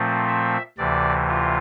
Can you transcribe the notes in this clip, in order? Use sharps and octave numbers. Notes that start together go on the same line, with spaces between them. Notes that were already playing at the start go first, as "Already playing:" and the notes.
Already playing: A#2 F3 A3 C4
E5
D2 C3 E3 D5
F4